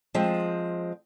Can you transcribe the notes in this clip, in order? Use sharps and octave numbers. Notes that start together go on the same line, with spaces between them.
F3 G#3 C4